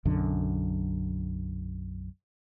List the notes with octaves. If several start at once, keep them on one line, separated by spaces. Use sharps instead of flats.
B1 F#2 D3